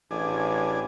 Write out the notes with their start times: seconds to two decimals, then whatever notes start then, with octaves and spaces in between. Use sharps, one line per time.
0.11 A1 D4 G#4